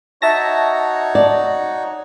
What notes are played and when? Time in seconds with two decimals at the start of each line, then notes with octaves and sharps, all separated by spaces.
0.22 D#4 F#4 C#5 E5 A5 A#6
1.15 D5